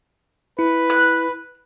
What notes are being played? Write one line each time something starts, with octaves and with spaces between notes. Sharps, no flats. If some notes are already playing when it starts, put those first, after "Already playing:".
E4 B4
F#6